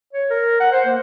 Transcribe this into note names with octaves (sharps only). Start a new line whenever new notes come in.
C#5
A#4
F#5
C5
A#3